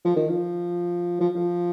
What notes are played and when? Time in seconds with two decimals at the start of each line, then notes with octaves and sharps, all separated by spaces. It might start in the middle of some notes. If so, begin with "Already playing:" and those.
0.05 F3
0.16 D#3
0.29 F3
1.20 F3
1.36 F3